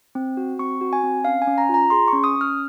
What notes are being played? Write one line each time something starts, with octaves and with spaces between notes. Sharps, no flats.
C4
F#4
C4 C#6
F#4
G#5
C4
C#4 F5
G#5
C#4
A#5
F4 A#5
G#4 C6
C#6
C#4
D#6
C#4
F6